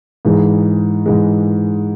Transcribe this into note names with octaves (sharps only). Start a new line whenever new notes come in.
G#2 E3 G#3
G#2 E3 G#3